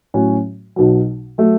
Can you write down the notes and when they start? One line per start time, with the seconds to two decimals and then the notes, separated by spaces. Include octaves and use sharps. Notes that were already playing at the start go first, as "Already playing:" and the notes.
0.14 A2 F#3 C#4 F#4
0.76 B1 B2 F#3
1.38 F#3 A3